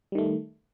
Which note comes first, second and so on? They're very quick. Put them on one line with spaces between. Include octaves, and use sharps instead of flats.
G3 D#3 A3